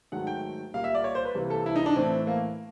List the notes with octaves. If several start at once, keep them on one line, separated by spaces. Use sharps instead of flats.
G#2 D#3 F#3 A3 F#5
G5
A#2 G3 A#3 F5
E5
D5
C#5
C5
B4
C3 E3 G3 A#3
A4
E4
D#4
D4
A2 E3 A3 C4
A#3